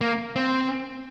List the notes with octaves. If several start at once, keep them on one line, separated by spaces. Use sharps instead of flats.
A#3
C4